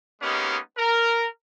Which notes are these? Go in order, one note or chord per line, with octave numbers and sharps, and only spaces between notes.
G#3 A#3 B3 C#4 D#4 G4
A#4